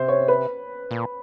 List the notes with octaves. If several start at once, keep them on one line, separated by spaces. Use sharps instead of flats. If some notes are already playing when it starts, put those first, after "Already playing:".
Already playing: C3 C5
C#5
B4
A#2